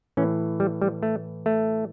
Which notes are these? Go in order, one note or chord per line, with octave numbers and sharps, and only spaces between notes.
A2 E3 C#4
G3
G3
A3
A3